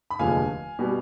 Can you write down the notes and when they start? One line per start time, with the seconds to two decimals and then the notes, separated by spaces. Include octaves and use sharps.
0.10 B5
0.19 F1 D#2 D3 F3 G#3 F5 G#5
0.79 B2 G3